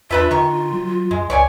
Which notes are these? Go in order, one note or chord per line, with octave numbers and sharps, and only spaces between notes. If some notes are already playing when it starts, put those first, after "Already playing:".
E2 D4 F4 B4 E5
D3 D#3 C#6
F#3
F#2 G#3
C#2 C#5 D5 G#5